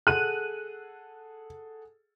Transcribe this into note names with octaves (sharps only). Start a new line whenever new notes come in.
G#4 A4 F#5 F#6 D#7